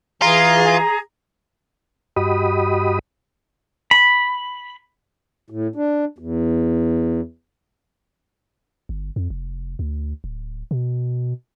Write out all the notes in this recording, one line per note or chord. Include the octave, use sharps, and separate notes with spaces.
E3 F4 G#4 A#5
G2 F#4 G4 D#5 B5 D#6
B5
A2
D4
E2
G1
F2
F1
D2
D1
B2